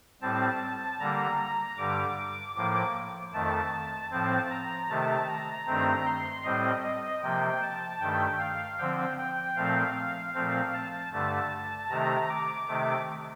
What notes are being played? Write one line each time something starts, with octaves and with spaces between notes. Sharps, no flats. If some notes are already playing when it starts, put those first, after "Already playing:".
A2 G3 C4 A5
D3 G3 A#3 A#5
G2 D3 G3 D6
A2 F3 A#3 D6
F2 D#3 A3 A5
A2 F3 C4 A5
A#5
C3 D#3 A3 A5
A#5
G2 D#3 A3 C4
C6
A2 G3 C4 D#5
D#5
C3 F3 A#3 G5
A5
G2 D#3 A3 G5
F5
D3 F3 C4 G5
G5
A#2 F3 A3 C4 F5
A#2 F3 A3 C4 F5
A5
G2 D3 A3
C3 D#3 A3 A#5
D6
C3 D#3 A3